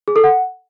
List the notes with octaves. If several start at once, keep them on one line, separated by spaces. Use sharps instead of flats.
G#4
A4
F#5